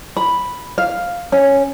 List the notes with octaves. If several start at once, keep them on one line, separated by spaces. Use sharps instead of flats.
B5
F5
C#4